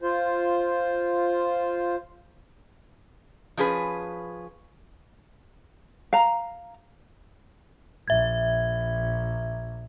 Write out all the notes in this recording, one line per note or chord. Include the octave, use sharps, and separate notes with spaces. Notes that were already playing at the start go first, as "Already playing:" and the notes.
F4 C5
F3 C#4 G#4 B4
F5 A#5
A#1 E5 G#6